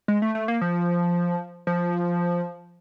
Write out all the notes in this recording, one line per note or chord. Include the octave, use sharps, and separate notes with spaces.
G#3
A3
A3
A#3
F3
F3